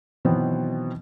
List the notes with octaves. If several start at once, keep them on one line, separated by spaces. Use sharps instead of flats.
B2 D#3 E3 F#3 B3 C4